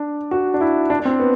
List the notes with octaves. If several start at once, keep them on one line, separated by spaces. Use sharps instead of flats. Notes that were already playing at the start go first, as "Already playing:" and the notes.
Already playing: D4
F#4
D4
E4
D4
D4
C4
B3